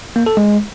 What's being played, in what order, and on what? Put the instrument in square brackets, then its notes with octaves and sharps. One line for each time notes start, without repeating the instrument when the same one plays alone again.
[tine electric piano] A#3
A4
G#3